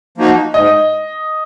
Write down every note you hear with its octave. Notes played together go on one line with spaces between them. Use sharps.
F3 A#3 D#4 F#4
G#2 D#5